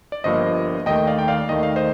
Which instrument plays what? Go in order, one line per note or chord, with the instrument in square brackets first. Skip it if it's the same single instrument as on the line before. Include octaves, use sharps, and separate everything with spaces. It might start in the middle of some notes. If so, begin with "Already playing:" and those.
[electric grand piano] D5
G1 G2 F3 A#3 C5 D#5
D#2 D#3 A3 D#5 G5
D5 F5
G5
D5 F5
D#2 D#3 A3 D#5
F5
C5 D#5